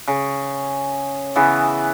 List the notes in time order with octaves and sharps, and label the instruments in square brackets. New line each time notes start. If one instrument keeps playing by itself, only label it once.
[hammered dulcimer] C#3
C#3 E3 B3